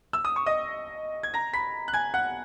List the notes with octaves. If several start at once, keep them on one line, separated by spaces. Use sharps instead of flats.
E6
D#6
C#6
D#5 D#6
G#6
A#5 A#6
B5 B6
F#6
G#5 G#6
F#5 F#6